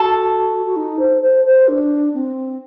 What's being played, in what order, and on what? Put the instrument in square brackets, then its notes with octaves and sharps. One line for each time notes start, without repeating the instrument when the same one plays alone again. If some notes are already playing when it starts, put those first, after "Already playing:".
Already playing: [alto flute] F#4 [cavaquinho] A4
[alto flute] F#4
D#4
C5
C5
C5
D4
C4